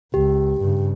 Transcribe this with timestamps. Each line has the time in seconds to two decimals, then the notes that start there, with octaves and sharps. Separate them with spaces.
0.14 C#2 G4
0.61 G2 C#3